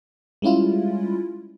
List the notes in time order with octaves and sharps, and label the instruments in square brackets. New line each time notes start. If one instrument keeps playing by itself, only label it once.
[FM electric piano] G3 G#3 C#4 E4 F4